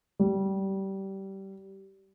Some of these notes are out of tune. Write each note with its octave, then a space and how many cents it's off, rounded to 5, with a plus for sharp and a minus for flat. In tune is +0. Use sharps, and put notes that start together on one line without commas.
G3 -20